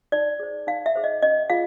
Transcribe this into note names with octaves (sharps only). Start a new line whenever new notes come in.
D#4 D5
G#4 C5
D#4 F5
E5
G#4 C5
D#5
C#4 D#5
F4 G#4 F5